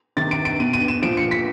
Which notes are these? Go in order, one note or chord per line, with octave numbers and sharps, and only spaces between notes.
C3 D#3 A6
D7
D7
B2 D#7
D#7
E7
A#2 F3 D7
C#7
B6